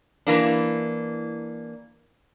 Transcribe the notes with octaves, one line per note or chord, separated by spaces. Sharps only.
E3 A#3 D4